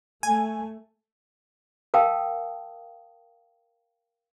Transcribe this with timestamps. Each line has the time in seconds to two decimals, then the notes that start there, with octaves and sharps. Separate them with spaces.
0.23 A3 G#5
1.94 A#4 F5 G5 A5 D#6